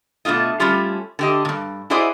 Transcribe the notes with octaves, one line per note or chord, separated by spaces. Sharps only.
B2 A3 D4 F4 D#5
G3 A3 C#4 F4 G4
D3 G4 D#5
G2 A#2
E4 F#4 G#4 C5 D5 D#5